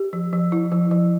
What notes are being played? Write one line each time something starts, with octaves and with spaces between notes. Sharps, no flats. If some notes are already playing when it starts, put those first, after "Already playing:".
Already playing: G4
F3
F3
E4
F3
F3